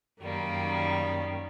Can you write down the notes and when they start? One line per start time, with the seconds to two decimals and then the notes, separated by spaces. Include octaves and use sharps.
0.20 F#2 D#3 G3 A#3